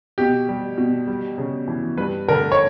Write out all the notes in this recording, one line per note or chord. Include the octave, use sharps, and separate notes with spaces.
B2 G4
G3
B2
G3
C#3
E3
G2 B4
D3 A#4
C#5